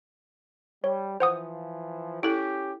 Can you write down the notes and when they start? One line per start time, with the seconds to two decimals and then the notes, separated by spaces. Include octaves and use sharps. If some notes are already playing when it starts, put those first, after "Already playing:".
0.84 G3 C#5
1.20 E3 F3 C5 F#5 D#6
2.23 C#4 E4 G4 A4